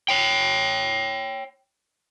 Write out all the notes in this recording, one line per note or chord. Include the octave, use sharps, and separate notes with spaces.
C#5 G5